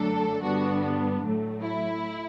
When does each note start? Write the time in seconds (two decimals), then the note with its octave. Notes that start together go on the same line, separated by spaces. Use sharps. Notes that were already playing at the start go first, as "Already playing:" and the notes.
Already playing: F#2 D3 F#3 A3 D4 A4
0.42 G2 D3 G3 B3 D4 F#4
1.22 A2 F#3 A3
1.61 E4